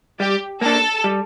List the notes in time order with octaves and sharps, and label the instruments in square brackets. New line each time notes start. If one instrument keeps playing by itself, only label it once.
[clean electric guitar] G3 [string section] G4
[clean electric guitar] A#3 D4 [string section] A4
[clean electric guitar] G3